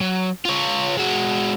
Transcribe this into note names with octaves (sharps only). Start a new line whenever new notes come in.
F#3
F4 C#5
G#3 F#4